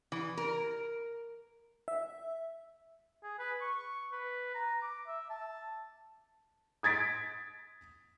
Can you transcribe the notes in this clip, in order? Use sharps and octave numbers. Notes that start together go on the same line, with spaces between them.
E3
A#4
E5
G#4
B4
C#6
B4
A#5
D6
E5
A5
D#6 G#6 A6 B6 D7